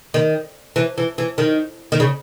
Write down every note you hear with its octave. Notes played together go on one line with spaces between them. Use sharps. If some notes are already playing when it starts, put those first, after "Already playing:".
D#3
E3
E3
E3
D#3
D#3
C#3